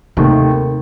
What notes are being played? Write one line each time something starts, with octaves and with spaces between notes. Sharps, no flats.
D#2 C3 D#3 A3